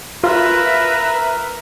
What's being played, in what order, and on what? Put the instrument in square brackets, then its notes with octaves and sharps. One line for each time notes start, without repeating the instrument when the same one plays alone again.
[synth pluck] F4 [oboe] A#4 [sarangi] B4 [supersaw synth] E5